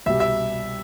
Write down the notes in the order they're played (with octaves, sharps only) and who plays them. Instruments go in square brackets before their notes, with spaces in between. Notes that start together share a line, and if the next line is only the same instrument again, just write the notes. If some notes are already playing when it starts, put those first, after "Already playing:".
[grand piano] C2 B2 G3 [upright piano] E5
[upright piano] E5